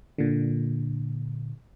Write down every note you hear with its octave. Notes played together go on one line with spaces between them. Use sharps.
A#2 D3